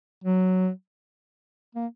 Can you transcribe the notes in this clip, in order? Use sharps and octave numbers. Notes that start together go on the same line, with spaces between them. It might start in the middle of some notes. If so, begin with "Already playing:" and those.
F#3
A#3